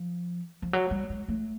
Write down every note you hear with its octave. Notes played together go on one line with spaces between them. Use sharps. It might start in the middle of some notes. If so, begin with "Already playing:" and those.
Already playing: F3
F3
F#3
G3
G#3
A3